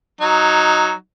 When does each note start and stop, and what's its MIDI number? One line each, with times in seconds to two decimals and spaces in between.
0.21 0.92 54
0.21 0.92 63